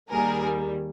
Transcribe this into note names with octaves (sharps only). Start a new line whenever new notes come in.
D#2 D#3 G3 A#3 G#4 A#4